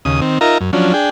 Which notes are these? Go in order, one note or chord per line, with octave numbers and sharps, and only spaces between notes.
D#2 C#3 D#6
D#3 C4
D#4 F4 A#4 E5 A#5
F#2
F3 F#3 C#4 D4
D4 G#4 G5